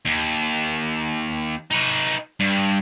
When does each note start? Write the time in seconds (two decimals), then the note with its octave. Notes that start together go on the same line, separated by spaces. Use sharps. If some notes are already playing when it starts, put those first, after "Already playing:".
0.05 D#2
1.71 D#4 B4
2.40 G2